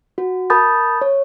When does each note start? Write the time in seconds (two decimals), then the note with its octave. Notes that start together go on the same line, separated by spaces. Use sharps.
0.18 F#4
0.50 A#4 A5 B5 D#6 G6 A6
1.02 C#5